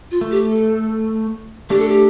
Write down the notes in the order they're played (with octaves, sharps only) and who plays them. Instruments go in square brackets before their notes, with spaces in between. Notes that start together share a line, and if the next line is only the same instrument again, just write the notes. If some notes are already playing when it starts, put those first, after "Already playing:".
[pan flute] F4
[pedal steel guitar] A3
[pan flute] G4
A4
[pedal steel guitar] A3 D4 [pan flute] G4
[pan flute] A4
G4